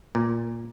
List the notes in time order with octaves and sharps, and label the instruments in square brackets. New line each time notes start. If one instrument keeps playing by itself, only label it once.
[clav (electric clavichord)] A#2